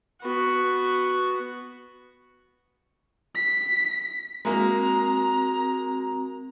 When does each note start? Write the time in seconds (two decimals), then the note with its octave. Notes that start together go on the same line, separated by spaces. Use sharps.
0.22 B3 F#4
3.35 B6
4.45 G#3 A#3 C4 F#4 A#4 A#5